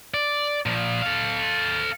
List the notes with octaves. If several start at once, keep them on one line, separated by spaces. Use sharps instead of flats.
D5
A#2 F3
A4 F5